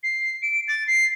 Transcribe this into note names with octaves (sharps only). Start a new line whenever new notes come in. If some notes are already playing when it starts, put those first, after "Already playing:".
C7
D7
A6
C7